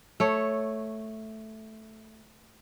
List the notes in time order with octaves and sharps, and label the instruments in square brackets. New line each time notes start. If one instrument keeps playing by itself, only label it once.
[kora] A3 C#5